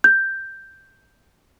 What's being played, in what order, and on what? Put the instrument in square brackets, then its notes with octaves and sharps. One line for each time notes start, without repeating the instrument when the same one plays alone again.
[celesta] G6